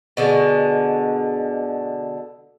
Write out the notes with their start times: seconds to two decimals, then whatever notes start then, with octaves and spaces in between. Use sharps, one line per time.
0.17 B2 D3 G#3